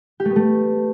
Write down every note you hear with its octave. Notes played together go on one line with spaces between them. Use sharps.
G4
A3
B3
A3